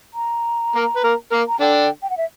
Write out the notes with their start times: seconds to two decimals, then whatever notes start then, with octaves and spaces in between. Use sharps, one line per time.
0.14 A#5
0.75 A#3 A#4
0.96 B4
1.04 A#3 A#4
1.32 A#3 A#4
1.48 A#5
1.60 D3 D4 G5
2.02 G5
2.10 F#5
2.17 E5